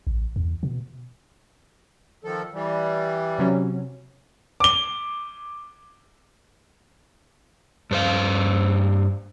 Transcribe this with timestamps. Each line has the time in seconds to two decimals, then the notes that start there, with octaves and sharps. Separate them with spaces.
0.07 A1
0.36 E2
0.63 B2
2.24 D#3 F3 A4
2.53 E3 G3
3.39 C3 F#3 C#4
4.60 D6 G7
7.91 G2 C5 F5